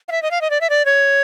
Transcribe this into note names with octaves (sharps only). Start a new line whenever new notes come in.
F5
E5
D#5
F5
D#5
D5
E5
D5
C#5